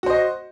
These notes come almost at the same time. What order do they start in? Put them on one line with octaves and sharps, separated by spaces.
F#4 C5 D#5